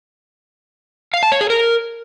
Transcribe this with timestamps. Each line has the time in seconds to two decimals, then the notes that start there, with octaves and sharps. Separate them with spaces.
1.14 F5
1.23 A5
1.32 C#5
1.41 G#4
1.50 A#4